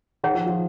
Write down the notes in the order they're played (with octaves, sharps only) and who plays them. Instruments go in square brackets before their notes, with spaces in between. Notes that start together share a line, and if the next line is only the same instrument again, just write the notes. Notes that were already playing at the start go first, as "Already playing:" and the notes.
[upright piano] D#3 [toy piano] G#4 C#5 F#5
[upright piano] F3
F3